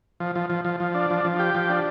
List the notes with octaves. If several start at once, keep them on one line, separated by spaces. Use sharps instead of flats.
F3
F3
F3
F3
F3
D4
F3
F3
G4
F3
D4